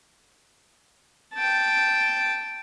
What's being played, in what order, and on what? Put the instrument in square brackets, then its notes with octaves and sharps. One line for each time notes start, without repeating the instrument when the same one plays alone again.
[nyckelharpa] G5 A5